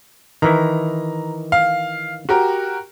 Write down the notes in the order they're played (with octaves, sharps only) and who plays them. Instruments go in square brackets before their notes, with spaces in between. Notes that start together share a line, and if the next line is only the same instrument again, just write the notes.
[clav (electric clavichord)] D#3 E3 E4 [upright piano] A#5
[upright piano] F5
F#4 G4 A#4